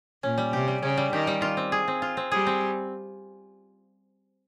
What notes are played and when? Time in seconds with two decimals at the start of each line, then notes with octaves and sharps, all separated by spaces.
0.23 A#2 C#4
0.38 G3
0.53 C3 G4
0.68 G3
0.82 C#3 C#4
0.98 G3
1.13 D#3 G4
1.27 G3
1.42 F4
1.57 C4
1.72 G#4
1.88 C4
2.02 F4
2.17 C4
2.31 G3 G#4
2.47 C4